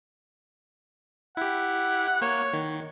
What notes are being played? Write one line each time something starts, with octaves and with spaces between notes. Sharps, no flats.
E4 G4 F#5
A#3 C#5
D#3